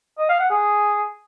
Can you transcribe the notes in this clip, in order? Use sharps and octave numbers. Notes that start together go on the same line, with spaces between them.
D#5
F5
F#5
G#4